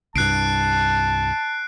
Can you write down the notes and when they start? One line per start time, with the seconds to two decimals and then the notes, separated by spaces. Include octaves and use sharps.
0.16 C2 G2 A5 F#6 C7 D7